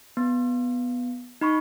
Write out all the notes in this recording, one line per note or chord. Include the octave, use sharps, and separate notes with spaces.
B3
D#4 B5 C#6